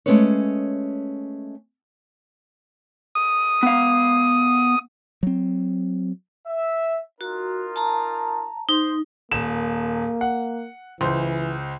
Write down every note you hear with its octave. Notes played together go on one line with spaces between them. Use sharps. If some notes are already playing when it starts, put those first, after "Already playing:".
G#3 A3 C#4 G#4 B4 C#5
D#6
B3 F5
F#3 C4
E5
D#4 F4 F#4 A#4
A5 A#5
D#4 C5
D#1 A#3 E7
F#5
C#2 E3 C5